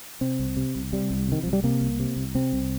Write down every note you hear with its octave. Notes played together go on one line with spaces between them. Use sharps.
C3 C4
C2
C3
C2
C3 G3
C2
C3 D#3
C2 F3
G3
C3 A#3
C2
C3
C2
C3 C4
C2